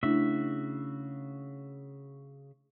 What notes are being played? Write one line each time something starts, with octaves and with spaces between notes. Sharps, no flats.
C#3 A3 D4 E4 F#4 E5